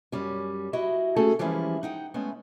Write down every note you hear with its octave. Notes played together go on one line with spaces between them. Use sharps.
F#2 G3 C#4
E4 F#4 D#5 E5
A3 C#4 F#4 G#4 A4 A5
E3 F3 G3 G#3 C#4 E4
D#4 F#5 G5
G#3 A3 B3 C#4